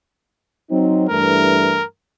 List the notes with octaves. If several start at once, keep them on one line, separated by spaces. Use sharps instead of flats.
F#3 C4 D#4
G2 E3 A3 A#4